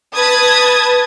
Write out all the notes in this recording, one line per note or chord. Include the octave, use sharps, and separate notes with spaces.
B4 A5 D#6 G#6 A6